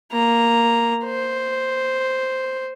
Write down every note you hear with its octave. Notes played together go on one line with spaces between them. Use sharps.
A#3 A#5
C5